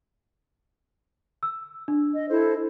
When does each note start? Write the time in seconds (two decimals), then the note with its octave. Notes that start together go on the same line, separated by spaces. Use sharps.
1.43 E6
1.88 D4
2.14 D#5
2.29 E4 A4 C5